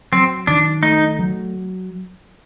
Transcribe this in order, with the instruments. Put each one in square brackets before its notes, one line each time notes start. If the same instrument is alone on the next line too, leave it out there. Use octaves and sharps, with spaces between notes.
[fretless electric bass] F#3 [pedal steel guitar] C4
[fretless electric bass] D#3 [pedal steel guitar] D4
[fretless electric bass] A3 [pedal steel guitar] D#4
[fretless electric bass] F#3